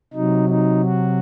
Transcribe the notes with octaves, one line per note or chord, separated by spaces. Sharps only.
C3 F#3 D#4
D#4
F#4